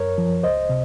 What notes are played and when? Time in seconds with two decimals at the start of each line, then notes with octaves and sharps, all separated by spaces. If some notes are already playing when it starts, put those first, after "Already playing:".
Already playing: F#2 A#4 C#5
0.18 F3
0.43 C#2 C5 D#5
0.69 C3